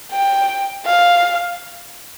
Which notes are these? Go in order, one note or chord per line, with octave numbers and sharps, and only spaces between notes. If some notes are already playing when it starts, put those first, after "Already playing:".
G5
F5